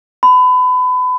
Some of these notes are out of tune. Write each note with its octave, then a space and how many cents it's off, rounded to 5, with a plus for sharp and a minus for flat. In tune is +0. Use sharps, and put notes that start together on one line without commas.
B5 +30